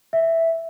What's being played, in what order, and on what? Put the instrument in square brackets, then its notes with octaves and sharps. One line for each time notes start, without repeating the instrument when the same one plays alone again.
[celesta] E5